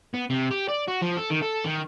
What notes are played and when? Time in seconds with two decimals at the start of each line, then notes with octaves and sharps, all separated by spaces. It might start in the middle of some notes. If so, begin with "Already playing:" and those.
0.14 B3
0.30 C3
0.51 G4
0.68 D5
0.88 F#4
1.01 F3
1.17 A4
1.31 D#3
1.42 A4
1.66 D#3